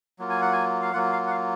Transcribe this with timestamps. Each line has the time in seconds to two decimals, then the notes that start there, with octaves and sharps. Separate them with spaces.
0.19 F#3 A#3 F4
0.30 G#5
0.42 F#5
0.53 G#5
0.82 F5
0.93 F#3 A#3 F4 F#5
1.13 F5
1.27 F#5
1.31 F5